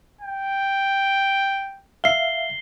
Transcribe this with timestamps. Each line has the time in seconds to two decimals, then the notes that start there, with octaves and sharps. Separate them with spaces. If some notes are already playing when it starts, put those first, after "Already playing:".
0.21 G5
2.04 E5 F5 C7 G7